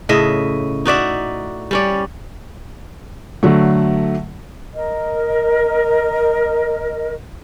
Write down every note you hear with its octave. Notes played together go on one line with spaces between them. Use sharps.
A2 C#3 D#5 E5
D#4 F#4 D5 E5
G3 C#4 D5
D3 F#3 A3
A#4 D#5